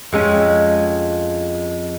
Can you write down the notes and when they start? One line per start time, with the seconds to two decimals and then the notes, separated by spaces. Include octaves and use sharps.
0.13 F2 G#3 C#4